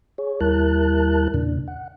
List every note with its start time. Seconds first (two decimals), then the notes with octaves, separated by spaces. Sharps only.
0.18 G#4 C#5
0.41 D#2 G3 E4 A#4 A5 F#6
1.34 E2 A#2 C#3 D4
1.68 F#5